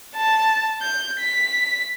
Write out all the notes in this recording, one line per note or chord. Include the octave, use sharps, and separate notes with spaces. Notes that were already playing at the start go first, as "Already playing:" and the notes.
A5
G6
B6